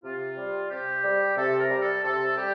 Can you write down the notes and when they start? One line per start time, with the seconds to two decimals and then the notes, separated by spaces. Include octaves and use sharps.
0.04 C3 F4
0.38 G3
0.70 C3 G4
1.04 G3
1.37 C3 A4
1.59 A#4
1.70 G3
1.81 A4
2.04 C3 A4
2.37 G3 G4